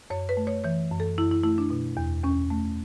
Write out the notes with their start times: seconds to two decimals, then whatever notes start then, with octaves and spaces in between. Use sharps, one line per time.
0.10 F#2 C#5
0.29 B4
0.37 A3
0.47 C#5
0.64 E3 C#5
0.91 F#2
1.00 A4
1.18 F#2 E4
1.31 E4
1.43 A3 E4
1.58 D4
1.70 B2
1.97 E2
2.24 E2 C#4
2.50 A3